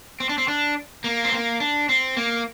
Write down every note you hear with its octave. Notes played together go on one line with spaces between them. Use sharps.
C4
D4
C4
D4
A#3
C4
A#3
D4
C4
A#3